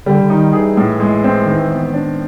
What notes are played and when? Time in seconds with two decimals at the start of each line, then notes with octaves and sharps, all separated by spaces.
0.06 D3 G3
0.22 D3
0.30 D#3 D#4
0.53 E3 G#4
0.77 A2
1.00 G#3
1.24 C4
1.46 D#3 E3
1.70 B3
1.94 D4